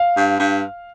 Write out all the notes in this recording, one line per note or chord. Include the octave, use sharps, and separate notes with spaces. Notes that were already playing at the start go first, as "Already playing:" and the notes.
Already playing: F5
G2
G2